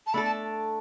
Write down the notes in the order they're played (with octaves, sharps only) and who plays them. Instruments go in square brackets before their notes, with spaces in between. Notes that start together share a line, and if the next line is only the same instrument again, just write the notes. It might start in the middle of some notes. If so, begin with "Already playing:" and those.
[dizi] A5
[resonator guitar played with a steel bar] A3 D4 A4 [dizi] B5
[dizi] A5